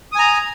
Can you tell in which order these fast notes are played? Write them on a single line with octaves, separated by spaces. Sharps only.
D#6 G#5 A#5